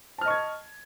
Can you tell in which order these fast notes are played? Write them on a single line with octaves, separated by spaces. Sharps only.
A5 F6 D#5 C#6 G#6